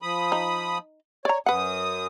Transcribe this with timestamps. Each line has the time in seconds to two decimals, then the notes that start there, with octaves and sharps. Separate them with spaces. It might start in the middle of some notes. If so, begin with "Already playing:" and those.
0.02 F3 B5 D#6
0.32 D#4
1.25 C#5 D5 A#5
1.46 F#2 B4 F#5 D#6